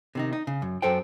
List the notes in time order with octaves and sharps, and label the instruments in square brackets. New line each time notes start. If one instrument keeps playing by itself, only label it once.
[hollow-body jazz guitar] C3 D#3 D#4
D#4
C#3
F#2
F#2 A4 C5 G5